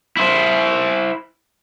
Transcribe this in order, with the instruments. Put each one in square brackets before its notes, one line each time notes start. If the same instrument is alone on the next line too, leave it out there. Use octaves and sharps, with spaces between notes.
[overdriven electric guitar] E4 C5